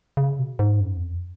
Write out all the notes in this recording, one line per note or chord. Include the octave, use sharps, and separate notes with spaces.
C#3
B2
G#2
F#2
F2